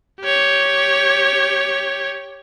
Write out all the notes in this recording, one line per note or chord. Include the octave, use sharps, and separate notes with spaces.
G4 C#5